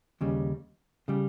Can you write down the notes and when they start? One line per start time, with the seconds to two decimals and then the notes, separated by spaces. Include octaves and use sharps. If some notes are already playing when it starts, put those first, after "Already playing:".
0.21 D#2 C#3 G3
1.08 C#3 G3